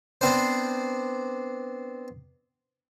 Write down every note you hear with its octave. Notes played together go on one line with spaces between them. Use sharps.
B3 C4 D4 C5